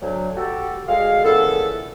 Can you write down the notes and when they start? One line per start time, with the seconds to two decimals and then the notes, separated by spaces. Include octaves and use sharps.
0.02 D2 F#3
0.37 F#4 G4 A4
0.88 D2 G#3 F5
1.24 A#2 C#3 E3 B3 A4